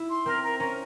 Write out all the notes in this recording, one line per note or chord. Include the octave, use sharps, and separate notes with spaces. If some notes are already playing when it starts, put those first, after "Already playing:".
Already playing: E4
C6
C4 A#4
A#4
C#4 A#4